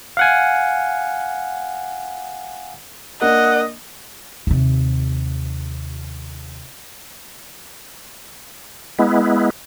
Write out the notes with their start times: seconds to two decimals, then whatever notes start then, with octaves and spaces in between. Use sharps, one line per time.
0.17 F5 F#5 G#5
3.22 A#3 D4 D#5 F#5
4.47 D#2 C3
8.99 G#3 B3 E4